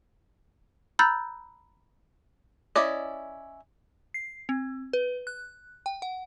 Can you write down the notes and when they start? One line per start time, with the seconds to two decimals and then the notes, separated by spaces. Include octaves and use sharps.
0.99 A#5 B5 E6 F#6 G6 A6
2.76 C#4 E4 D5 D#5
4.14 C7
4.49 C4
4.93 B4
5.27 F#6
5.86 G5
6.02 F#5